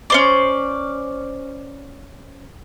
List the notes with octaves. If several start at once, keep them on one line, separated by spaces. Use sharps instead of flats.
C#4 C5 D5